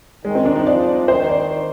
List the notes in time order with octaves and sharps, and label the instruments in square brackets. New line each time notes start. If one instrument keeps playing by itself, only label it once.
[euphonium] D#3 [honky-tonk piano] G#3
[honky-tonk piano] C4
D4
D#4
[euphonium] F3 [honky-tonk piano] D5
[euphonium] D#3 [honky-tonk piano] C5
[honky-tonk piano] D5